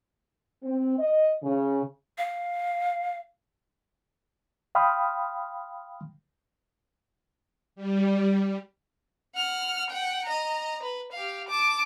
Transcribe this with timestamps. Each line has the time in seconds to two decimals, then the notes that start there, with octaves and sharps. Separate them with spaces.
0.63 C4
0.98 D#5
1.43 C#3
2.18 F5
4.75 F5 G5 B5 C6 D#6 F6
7.76 G3
9.35 F#5 F6
9.90 F#5 G5
10.25 D#5 A#5
10.83 B4
11.12 G4 F5
11.48 A5 D6